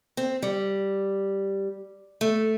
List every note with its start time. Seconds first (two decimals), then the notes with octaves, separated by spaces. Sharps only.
0.17 C4
0.42 G3
2.21 A3